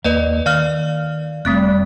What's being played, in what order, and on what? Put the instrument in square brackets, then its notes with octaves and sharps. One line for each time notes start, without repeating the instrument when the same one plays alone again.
[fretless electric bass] D#2 A#3 [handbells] B4 D5 D#5
[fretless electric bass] D#3 [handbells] D5 F5 F6
[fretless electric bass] F1 [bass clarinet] G3 [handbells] A3 C4 F#6